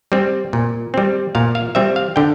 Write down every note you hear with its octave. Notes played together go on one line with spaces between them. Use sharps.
G3 C4
A#2
G3 C4
A#2 F5
F5
G3 C4 E5
F5
D3 G5